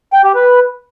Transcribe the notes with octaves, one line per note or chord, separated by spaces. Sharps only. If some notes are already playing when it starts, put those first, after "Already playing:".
G5
G4
B4